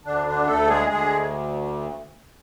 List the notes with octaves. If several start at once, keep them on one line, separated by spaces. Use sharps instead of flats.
D2 D3 D4
D3 D4
D2 A3 A4
G#3 G#4
D2 G#3 G#4